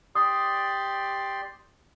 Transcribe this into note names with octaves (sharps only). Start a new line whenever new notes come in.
G4 D5 C6 D#6